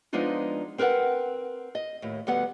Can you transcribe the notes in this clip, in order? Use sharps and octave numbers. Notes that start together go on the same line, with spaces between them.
F3 G#3 B3 D4 D#4 F4
C4 A#4 B4 D5 F#5
D#5
D#2 A2
D2 G3 B3 F#5